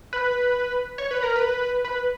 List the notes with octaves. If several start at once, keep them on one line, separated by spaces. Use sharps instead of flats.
B4
C#5
B4
A#4
B4
B4